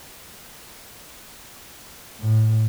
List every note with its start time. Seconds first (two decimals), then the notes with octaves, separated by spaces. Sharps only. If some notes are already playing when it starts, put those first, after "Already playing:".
2.20 A2